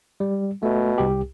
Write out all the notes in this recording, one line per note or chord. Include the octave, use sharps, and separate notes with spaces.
G3
B2 A3
C2 G4